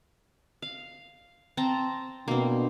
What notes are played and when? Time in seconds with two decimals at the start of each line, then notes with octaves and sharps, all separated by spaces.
0.62 F5
1.57 C4 A5 A#5
2.28 B2 A#3 C4 D4